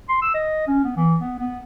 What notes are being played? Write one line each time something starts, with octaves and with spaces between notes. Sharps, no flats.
C6
E6
D#5
C#4
B3
E3
B3
B3